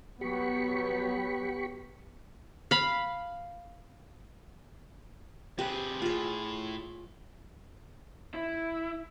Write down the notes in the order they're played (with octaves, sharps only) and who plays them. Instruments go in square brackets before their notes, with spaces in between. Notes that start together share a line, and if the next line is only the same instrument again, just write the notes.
[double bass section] F#3 B3 [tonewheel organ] G4 B5 C#6
[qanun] F5 B5
[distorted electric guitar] C3 G#4 [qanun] G4 B4
[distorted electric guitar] A2 [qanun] F4 G#4
[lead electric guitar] E4